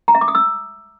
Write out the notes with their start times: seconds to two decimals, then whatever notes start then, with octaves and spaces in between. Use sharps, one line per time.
0.08 A#5
0.15 E5
0.21 D6
0.28 D#6
0.35 E6